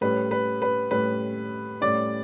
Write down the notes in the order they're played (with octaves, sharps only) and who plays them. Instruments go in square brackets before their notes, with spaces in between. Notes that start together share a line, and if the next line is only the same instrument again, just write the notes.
[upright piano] A2 G3 C#4 [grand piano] B4
[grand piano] B4
B4
[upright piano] A2 G3 C#4 [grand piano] B4
[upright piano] A2 G3 C#4 [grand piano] D5